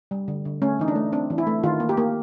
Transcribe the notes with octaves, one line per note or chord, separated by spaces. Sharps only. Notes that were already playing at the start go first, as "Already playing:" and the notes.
G3
D3
D3
A3 C#4
E3 D#4
D4
A3
C4 D4
E3
E4
A3
D#3 F4
A#3
G4
A#3